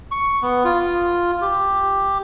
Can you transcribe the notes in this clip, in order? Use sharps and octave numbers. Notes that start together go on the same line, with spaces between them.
C#6
B3
F4
G4